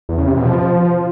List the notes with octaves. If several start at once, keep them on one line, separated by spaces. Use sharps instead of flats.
E2
C#3
C3
B2
F3